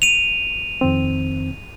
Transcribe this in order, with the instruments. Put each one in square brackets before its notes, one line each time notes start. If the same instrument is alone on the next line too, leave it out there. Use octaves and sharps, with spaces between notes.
[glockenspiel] D#7 F7
[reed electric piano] F2 D#3 C4